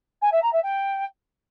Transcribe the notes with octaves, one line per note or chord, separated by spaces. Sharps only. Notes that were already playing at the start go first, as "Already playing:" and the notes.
G#5
E5
A#5
E5
G5